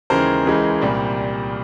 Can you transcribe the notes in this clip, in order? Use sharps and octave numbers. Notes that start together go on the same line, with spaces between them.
D#2 C#3 E3 G#3 A#4 C5
C#2 C#3 E3 G#3
C2 A#2 G3